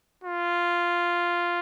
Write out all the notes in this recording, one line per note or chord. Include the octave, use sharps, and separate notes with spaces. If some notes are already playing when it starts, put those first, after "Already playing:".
F4